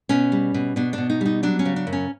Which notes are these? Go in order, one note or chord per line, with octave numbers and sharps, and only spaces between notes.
B2 C#4
G3
B2
B2 D4
B2 D4
D#4
G3 D#4
F#3 D4
C#4
C#3
D4
F#2
C#4